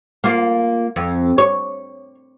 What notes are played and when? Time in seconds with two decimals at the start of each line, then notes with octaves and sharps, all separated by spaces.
0.24 A#3 F4
0.96 F2
1.38 C#5